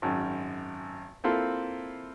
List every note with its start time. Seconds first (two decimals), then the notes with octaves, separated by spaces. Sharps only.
0.02 G#1 F#2
1.24 A#3 C4 E4 F4 A4